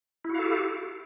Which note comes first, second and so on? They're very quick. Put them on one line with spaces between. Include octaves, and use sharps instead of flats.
E4 F#4 F5 A4 G4